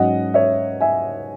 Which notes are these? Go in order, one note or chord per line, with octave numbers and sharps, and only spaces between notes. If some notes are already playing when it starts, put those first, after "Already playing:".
Already playing: G#2 F#3 C#4 D#5 F#5
C#5 E5
E5 G#5